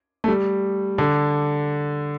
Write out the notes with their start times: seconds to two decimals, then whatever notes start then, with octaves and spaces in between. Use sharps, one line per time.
0.24 A3
0.28 G3
0.98 D3